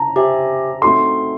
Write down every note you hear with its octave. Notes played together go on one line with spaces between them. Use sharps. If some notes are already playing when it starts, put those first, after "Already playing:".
Already playing: A5 A#5
G4 C5 E5 G#5
A3 C4 D#4 F#4 A4 C6